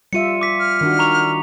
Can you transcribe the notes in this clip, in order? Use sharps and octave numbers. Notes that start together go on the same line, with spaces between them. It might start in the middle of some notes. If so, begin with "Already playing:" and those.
G3 F4 E5 C#7 D#7
D6 B6
F6
D#3 D4 F#4
A#5 C#6 F7